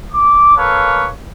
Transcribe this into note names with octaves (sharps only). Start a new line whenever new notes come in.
D6
A#3 A4 B4 C#5 F5